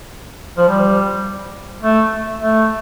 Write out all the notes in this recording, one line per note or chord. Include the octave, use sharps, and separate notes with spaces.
F3
G3
A3
A3